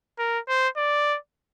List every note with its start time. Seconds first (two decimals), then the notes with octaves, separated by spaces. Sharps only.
0.19 A#4
0.48 C5
0.77 D5